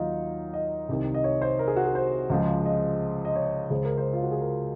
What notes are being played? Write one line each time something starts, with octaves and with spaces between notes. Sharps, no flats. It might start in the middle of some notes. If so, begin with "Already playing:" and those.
Already playing: D#2 D#3 F#3 D#4 F4
D#5
C2 C3 D#3
D#5
C#5
C5
A#4
G#4
F#4
G#4
C5
C#2 C#3 F3 G#3
D#5
D#5
C#5
C#2 C#3 G#3 C5
A#4
C5
F4
F#4
G#4
A#4